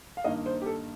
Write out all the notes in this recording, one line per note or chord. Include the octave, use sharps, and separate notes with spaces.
F5
G2 D#3 A#3 D#4 D#5
C5
G4
A4